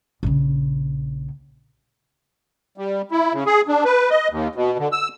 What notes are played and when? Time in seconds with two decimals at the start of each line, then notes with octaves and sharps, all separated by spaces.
0.23 A#1 C#3
2.78 G3
3.11 E4
3.33 C#3
3.46 G#4
3.68 D4
3.85 B4
4.10 D#5
4.31 D#2
4.55 B2
4.79 D3
4.92 E6